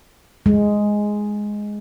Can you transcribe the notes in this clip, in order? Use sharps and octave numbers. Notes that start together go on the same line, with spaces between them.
G#3